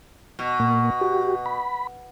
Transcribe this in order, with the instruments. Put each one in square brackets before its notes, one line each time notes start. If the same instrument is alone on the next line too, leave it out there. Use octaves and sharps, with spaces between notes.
[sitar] B2
[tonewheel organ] A#2 A#3
F#4 G4
B5